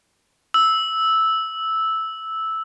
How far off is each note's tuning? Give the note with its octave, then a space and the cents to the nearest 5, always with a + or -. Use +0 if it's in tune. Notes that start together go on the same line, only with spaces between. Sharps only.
E6 -10